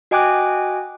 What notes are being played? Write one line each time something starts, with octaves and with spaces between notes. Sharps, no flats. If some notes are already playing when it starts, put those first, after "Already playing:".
F#4 D#5 G5 G#5 D6 F#6